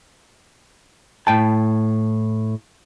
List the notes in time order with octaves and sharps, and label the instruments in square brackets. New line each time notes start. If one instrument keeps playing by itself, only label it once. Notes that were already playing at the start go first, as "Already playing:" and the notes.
[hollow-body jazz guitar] A2 G5 A5